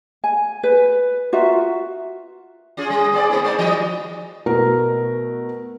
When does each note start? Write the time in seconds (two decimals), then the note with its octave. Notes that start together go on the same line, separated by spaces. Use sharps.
0.24 G#5
0.63 B4
1.33 F4 F#4 A#4 E5
2.77 C#4 F4 G#4
2.90 G3
3.13 B3 G#4 D5
3.29 A3 C4 E4
3.44 G#3 D#4 D5
3.58 E3 G3 D#5
4.46 B2 A3 E4 F#4 A#4 B4